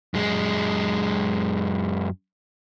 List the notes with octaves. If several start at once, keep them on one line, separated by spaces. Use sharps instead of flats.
F#2 G#3